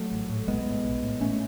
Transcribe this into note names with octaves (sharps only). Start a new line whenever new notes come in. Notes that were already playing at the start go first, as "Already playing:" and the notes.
Already playing: F#3 A3
A1
A2
B1 G#3 B3
A2
B1
A2
A1 A3 C#4